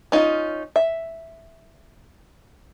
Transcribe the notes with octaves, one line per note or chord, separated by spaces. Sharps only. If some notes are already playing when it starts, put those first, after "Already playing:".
C#4 D#4 F4
E5